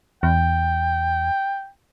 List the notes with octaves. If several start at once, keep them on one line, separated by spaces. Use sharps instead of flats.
E2 G5